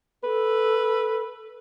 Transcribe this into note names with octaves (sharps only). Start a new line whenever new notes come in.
A4 B4